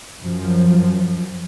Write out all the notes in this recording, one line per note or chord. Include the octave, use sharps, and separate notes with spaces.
F#2 F3